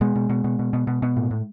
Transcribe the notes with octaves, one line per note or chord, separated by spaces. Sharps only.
B2 G#3
B2
B2
B2
B2
B2
B2
B2
A2
A2